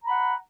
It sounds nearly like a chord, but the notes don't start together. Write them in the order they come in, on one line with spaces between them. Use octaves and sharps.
A#5 B5 F#5